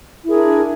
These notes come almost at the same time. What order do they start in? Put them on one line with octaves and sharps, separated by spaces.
E4 G#4 A#4 D4